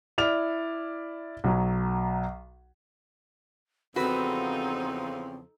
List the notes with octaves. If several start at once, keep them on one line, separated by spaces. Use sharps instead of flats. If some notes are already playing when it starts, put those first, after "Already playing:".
E4 D5 F6 F7
B1 F#3
E2 C#3 F3 C4 D#4 F#4 A4 B4